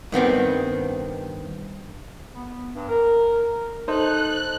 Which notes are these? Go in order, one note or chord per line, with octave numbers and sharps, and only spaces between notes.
G2 D#3 B3 C4
B3
G2
A#4
D#4 A4 C5 F#6